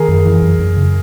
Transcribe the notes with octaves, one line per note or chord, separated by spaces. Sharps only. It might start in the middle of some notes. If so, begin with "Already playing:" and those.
Already playing: D#3 G#4 A#4
F#2
E3
F#2
F#2
C#3